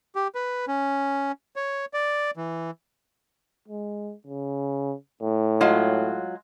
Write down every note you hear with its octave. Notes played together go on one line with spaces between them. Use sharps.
G4
B4
C#4
C#5
D5
E3
G#3
C#3
A2
F#3 G#3 F4